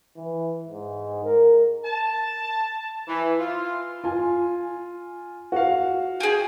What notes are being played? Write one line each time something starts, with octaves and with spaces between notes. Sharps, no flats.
E3
G#2
A#4
A5
E3
F4
F4 G#5
F#4 F5
G4 G#4